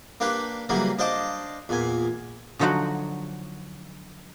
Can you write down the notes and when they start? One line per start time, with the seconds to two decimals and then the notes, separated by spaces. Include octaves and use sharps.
0.20 A#3 D4 G4 B4
0.69 C#3 E3 F#3 G3 A#3
0.99 D4 C5 D#5 F5 A5 D6
1.69 E2 A#2 G#5
2.59 D3 F3 F#3 D#4 F#4 F#5